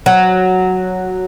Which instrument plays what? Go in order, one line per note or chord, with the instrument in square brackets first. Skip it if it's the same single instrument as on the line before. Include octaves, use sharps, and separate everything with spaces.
[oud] F#3